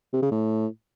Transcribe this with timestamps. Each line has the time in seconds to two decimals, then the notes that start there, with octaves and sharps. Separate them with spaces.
0.13 C3
0.22 C#3
0.31 A2